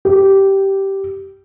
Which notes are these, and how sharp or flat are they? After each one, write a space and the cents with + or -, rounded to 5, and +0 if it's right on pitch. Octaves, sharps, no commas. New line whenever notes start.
G4 -10